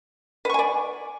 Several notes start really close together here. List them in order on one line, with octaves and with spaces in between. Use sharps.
B4 C#6 G#5 D5